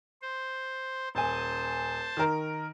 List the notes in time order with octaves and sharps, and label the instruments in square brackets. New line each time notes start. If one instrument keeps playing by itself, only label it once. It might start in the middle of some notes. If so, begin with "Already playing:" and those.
[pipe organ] C5
[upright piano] D#1 G#5 [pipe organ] C5 A5
[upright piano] D#3 A#4